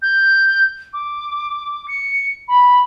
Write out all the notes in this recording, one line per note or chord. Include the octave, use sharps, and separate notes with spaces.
G6
D6
C#7
B5